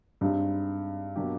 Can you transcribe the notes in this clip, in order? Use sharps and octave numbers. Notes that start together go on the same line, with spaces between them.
G2 G#3 C4 D#4
B2 F#3 A#3 D4 G4